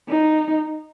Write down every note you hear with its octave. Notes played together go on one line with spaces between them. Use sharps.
D#4